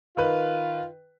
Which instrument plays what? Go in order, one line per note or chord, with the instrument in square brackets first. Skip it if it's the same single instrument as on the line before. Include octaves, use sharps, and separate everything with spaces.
[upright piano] D#3 B4 [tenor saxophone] F4